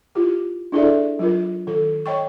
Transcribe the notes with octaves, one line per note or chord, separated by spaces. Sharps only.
E4 F4 G4
D4 E4 G#4 A4 D5 E5
F#3 F4 A#4
D#3 A4
C#5 D#5 G5 C#6